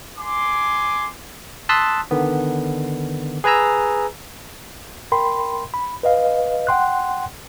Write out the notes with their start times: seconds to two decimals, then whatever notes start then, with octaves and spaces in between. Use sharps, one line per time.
0.19 G#5 C6 D6
1.69 A5 C6 D#6 E6 F#6 B6
2.11 D3 D#3 B3
3.44 G#4 B4 G#5 A#5 E6
5.12 A#4 G5 B5 C6
5.74 B5
6.03 B4 D#5 F5
6.67 F#5 G5 C6 F#6